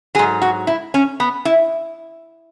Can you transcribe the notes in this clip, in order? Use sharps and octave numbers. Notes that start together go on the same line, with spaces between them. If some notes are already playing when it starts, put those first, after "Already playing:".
G#2 F#3 G#4
F#4
E4
C#4
B3
E4